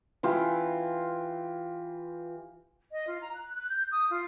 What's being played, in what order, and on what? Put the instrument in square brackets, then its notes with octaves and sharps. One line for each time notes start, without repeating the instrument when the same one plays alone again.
[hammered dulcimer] E3 F4 G4
[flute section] D#5
F4
A#5
F#6
F#6
G6
D#6
F4